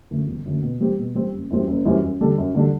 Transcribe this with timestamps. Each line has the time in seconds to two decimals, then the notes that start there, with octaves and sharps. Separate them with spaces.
0.11 F#2 D3 A3
0.28 G1
0.45 F#2 D3 A3
0.63 B2
0.81 G3 C4 G4
0.99 B2
1.15 G3 C4 G4
1.33 F#1
1.50 F#2 E3 G3 C4
1.68 F#1
1.85 F#2 E3 G3 C4
2.03 F#2
2.20 D3 G3 D4 A4
2.38 F#2
2.55 D3 G3 D4 A4